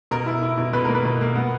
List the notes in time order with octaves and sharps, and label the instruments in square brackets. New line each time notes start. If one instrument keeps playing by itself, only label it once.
[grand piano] B2 A#4
E4
E4
B2
B2 B4
A#3 A#4
B4
B2
A#3
B3